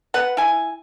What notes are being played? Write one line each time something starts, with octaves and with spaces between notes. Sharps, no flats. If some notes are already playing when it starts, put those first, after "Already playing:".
B4 F#5
E4 G#5